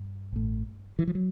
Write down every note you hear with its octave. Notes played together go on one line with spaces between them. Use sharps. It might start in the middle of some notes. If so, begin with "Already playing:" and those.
Already playing: G2
A1 A2
E3
F3
F#3